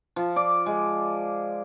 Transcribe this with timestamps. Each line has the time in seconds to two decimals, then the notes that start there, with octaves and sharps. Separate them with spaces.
0.16 F3
0.36 D5
0.66 G#3